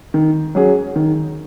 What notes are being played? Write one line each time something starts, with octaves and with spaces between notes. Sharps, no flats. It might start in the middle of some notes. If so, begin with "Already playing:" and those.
D#3
F#3 C#4 G#4
D#3